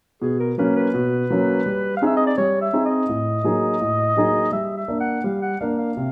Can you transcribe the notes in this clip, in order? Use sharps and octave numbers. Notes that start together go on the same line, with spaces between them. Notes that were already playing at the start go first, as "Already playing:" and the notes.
B2 G#4
A#4
F#3 A#3 C#4 B4
B4
B2
F#3 A#3 C#4
G3
F5
C4 D#4 G#4 E5
D#5
D5
G3 C#5
E5
C4 D#4 G#4
D#5
A2
F#3 A#3 D#4 G#4
A2
F#3 A#3 D#4 G#4
G3 E5
E5
A#3 D4
F#5
G3 F5
F#5
A#3 D4 F5
F5
C3